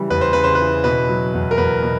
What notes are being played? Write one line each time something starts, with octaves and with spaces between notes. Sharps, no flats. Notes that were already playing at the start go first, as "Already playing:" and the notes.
Already playing: C#3 E3 G3
E2 B4
C5
C#3 B4
C5
E3 B4
B2 B4
F#3
E2
A#4
E2 B4
B2